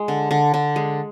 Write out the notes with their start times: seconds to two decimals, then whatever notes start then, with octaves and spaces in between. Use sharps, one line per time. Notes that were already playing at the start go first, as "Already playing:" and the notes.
Already playing: G#3
0.08 D3
0.31 D3
0.54 D3
0.76 G#3